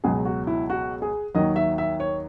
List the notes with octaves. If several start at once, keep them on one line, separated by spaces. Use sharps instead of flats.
C#2 B2 F#3 G#4
F#4
E4
F#4
G#4
D#2 D#3 F#3 D#5
E5
E5
C#5